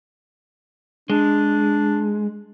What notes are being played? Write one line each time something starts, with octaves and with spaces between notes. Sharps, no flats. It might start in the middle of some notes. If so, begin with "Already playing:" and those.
G#3 D4